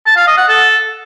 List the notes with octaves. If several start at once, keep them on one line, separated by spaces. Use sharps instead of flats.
A5
F5
D#5
F#5
A4